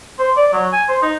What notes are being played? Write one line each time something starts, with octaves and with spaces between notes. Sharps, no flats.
C5
D5
F#3
G#5
C5
D#4